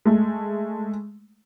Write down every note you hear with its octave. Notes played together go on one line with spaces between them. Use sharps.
G#3 A3